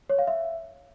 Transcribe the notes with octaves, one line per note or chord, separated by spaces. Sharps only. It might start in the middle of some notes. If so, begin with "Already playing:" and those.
C#5
F5
E5